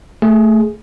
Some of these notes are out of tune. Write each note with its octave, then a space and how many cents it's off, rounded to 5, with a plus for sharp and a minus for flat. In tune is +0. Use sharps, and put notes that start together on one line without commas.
A3 +0 G#4 +0